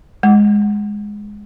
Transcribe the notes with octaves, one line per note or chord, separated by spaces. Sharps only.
G#3